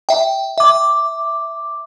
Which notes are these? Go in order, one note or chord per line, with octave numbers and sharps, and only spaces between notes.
E5 G5
E5 D6